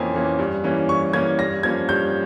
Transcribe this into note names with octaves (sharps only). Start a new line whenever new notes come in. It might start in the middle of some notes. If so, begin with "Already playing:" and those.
Already playing: F2 E3 A#3 C#4 C5 G#5
E3 A#3 C#4
G2
E3 A#3 C#4
G2 C#6
E3 A#3 C#4 G#6
G2 A#6
F3 A#3 C#4 G#6
G2 G6